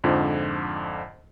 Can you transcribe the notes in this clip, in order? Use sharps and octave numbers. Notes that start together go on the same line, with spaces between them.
F2 G#2 D3 F3